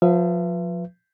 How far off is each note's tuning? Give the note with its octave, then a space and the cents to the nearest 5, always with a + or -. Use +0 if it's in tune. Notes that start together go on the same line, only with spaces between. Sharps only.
F3 +25 B4 +0 E5 +40